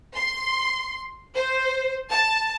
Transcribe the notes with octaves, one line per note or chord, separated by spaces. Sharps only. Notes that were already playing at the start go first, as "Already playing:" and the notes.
C6
C5
A5